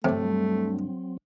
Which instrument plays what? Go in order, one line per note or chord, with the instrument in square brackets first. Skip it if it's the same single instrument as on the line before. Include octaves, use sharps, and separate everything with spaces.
[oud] D2 G2 [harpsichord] C3 [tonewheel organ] F#3 C4 [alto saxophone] A3